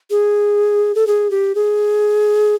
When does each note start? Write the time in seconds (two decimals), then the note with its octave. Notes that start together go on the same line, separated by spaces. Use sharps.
0.11 G#4
0.95 A4
1.07 G#4
1.31 G4
1.55 G#4